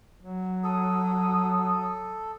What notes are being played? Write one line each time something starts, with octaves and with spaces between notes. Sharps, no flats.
F#3
A4 D#6